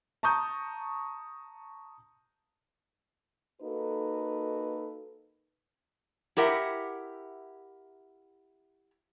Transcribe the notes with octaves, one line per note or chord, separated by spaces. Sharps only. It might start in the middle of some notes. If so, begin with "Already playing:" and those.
A5 A#5 C#6 D#6 G6
A#3 D#4 F#4 A4 B4
E4 G4 A#4 E5 F#5